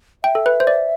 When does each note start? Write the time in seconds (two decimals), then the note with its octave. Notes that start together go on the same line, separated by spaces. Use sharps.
0.24 E5 G5
0.35 A4
0.46 B4
0.60 C5
0.67 D5